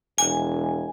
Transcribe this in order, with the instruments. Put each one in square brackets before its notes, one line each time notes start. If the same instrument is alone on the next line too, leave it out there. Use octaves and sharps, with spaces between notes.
[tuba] E1 [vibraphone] G#5